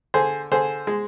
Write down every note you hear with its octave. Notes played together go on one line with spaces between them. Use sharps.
D3 G#4 C5
D3 G#4 C5
G#3